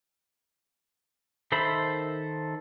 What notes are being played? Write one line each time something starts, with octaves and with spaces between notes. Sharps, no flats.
D#3 A4 C5 E5 B5